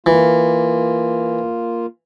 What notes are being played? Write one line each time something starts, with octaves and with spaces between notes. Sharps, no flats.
E3 A#3 F4